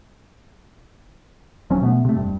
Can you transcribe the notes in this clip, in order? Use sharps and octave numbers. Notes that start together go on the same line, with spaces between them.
D#1 F3 F#3 C#4
B2 A3 B3
C3 A3
F1 G2